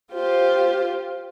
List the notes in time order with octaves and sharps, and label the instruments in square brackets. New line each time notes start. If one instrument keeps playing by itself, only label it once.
[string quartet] F4 G4 C5